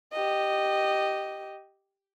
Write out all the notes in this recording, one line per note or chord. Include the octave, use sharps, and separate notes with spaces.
G4 D#5